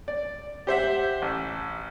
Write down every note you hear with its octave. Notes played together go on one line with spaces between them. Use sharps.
D5
G4 C5 E5 F#5
A1